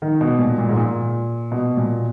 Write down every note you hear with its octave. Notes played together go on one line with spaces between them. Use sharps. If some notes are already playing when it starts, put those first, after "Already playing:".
D#3
B2
A#2
A#2
G#2
A#2
B2
A#2